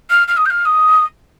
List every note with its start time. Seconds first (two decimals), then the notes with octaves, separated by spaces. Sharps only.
0.10 F6
0.28 F6
0.37 D#6
0.46 G6
0.50 F6
0.65 D#6